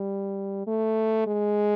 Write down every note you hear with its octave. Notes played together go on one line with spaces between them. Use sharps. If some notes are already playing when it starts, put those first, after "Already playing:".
Already playing: G3
A3
G#3